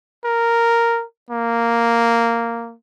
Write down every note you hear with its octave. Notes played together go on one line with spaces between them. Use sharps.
A#4
A#3